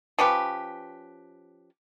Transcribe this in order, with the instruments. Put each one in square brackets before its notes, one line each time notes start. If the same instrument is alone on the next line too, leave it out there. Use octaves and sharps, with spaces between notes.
[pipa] F3 C#4 G4 B4